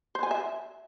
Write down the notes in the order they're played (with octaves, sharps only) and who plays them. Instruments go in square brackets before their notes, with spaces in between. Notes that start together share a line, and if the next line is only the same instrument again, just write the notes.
[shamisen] C5
G#5
E5